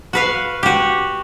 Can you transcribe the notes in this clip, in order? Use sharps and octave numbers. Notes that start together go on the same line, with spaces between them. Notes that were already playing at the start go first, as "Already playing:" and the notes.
F#4 B4 F5
F#4 G4